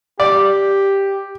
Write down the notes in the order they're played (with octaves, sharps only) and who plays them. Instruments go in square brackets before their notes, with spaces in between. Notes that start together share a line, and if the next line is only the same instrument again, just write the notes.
[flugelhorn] G4 [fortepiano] D5